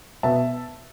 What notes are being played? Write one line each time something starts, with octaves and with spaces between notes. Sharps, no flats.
B2 B3 E5 A5